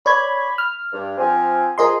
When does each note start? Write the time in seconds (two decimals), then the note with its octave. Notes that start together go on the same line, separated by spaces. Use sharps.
0.06 C#5 D5 B5 G#6
0.58 F6
0.93 G2
1.18 F3 C4 G#5
1.78 F3 G#4 A#4 D#5 C6